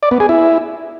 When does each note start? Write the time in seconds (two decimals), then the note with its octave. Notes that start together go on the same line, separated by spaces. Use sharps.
0.03 D5
0.11 B3
0.20 G#4
0.29 E4